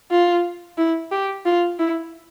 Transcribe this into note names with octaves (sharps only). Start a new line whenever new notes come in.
F4
E4
G4
F4
E4